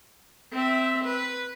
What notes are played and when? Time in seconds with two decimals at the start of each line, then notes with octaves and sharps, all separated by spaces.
0.52 C4 E5
1.04 B4